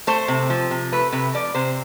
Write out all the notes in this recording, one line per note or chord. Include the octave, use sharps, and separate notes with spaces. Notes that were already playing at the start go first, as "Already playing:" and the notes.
A3 C5
C3
F3
C3
A3 B4
C3 B4
F3 D5
C3 C5